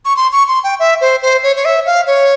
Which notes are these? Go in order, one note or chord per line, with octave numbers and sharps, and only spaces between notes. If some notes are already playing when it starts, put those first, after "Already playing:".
C#6
C6
C#6
C6
G5
E5
C5
C5
C#5
C#5
E5
F5
C#5